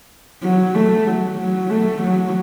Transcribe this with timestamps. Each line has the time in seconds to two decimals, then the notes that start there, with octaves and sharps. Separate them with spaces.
0.43 F#3
0.75 A3
1.07 F#3
1.38 F#3
1.70 A3
2.03 F#3